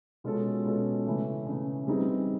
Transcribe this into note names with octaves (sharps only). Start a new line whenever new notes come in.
B2 G#3 C#4 F4 A4
B2 G#3 C#4 F4 A4
C#3 E3 A3
C#3 E3 A3
G3 C4 D#4 G#4 B4